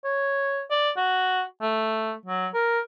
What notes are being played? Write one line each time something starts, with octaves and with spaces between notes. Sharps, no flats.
C#5
D5
F#4
A3
F#3
A#4